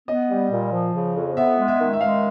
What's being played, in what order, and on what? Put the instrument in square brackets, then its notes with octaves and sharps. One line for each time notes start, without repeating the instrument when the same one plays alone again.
[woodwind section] B3 [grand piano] D#5
[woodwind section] G3
A#2
F3
C#3
F2
[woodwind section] B3 [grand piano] E5
[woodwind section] G#3
[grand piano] E5
[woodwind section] D#3
[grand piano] E5
[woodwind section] G#3 [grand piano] F5